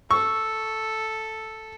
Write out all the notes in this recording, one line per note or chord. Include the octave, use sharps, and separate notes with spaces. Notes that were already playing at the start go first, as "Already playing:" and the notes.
A4 C#6 E6